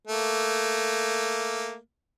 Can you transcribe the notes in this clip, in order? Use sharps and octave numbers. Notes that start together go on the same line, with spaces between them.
A3 A#3